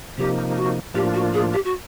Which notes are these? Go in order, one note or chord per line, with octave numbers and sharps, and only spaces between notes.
C3 F3 A#3 D#4 G4
F#4
A2 F3 A#3 D4 F4 G4
F#4
G#4
G4
F#4